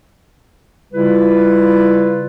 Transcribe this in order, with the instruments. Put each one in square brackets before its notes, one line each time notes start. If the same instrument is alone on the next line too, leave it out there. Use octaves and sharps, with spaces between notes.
[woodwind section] C#3 G3 E4 F4 B4